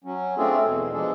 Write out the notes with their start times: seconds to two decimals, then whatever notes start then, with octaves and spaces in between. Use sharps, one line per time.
0.04 F#3 C#4
0.38 A3 C4 D4 F4 G#4 A4
0.65 E2 B2
0.92 B2 F3 G#3 D4 G#4 A4